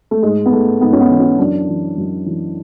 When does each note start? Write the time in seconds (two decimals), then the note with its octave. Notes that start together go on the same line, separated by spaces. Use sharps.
0.11 A3
0.23 G#2 G#3
0.46 B3
0.52 G#2 A3
0.81 G#2 B3
0.93 C#4
1.01 B3
1.10 E3
1.20 C#4
1.39 F#2 D4
1.68 E3
1.97 F#2
2.26 E3